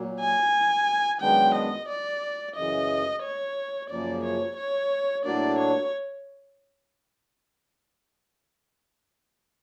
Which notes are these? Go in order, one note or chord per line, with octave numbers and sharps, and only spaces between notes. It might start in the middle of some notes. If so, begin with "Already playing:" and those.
Already playing: A#2 F#3 A#3
G#5
F#2 D#3 G#3 B3 D4 G5
D#5
D5
F#2 C#3 E3 D#5
C#5
F#2 C#3 F3 A#3 D5
C#5
C#5
A2 F#3 A#3 D4 D5
C#5